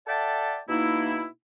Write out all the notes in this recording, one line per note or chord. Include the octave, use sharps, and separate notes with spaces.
A4 D5 E5 F#5 G5 A5
B2 A#3 D#4 E4